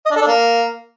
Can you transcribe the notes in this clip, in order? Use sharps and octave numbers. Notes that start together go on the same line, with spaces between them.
D#5
D4
A4
D4
A#3